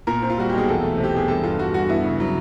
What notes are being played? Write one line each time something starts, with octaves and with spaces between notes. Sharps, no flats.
A#2 A#4
C4
F4
G3 F#4
B1 G4
G#4
E2 A4
A3
C3
G4
E2 G#4
G2 A4
G2 F4
G2 F#4
G2 F#4
B3 E4
C#3
F#3